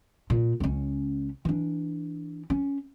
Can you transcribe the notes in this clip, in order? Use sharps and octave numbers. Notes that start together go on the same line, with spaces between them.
A#2
C#2 C#4
E3 D4
C#4